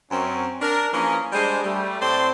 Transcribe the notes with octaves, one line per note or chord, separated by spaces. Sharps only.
F#2 C4 C#4
D4 A#4
E3 F3 A#3 C#4 G#4 A#4
G3 G#3 D4 G#4 C5
G3 A3
A2 C4 A4 C5 D5 C6